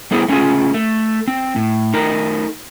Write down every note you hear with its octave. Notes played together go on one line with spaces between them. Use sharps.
G3 A3 B3 C4 E4 G#4
A3 C#4 D#4 F4 G#4
A3
C4
A2
A3 D#4 A#4